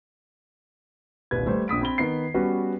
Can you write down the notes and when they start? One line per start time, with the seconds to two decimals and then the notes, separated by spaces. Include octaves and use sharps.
1.31 D#1 C2 B4 G#6
1.46 G3 A3 B4 C5
1.68 A#1 D#6 B6 D7
1.81 C4 B5 G7
1.98 D#3 B3 C7
2.34 G3 B3 C#4 F#4 B4